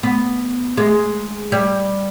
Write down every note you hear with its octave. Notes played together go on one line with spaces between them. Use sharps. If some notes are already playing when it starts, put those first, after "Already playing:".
B3
G#3
G3